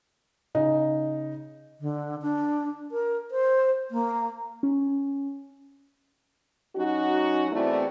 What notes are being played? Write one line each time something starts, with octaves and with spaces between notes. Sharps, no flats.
C#3 D#4
D3
D4
A#4
C5
A#3
C#4
F#3 C#4 D#4 F#4
E2 A3 C4 E4 F#4 D5